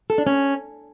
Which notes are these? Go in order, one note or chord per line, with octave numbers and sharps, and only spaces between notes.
A4
D4
C#4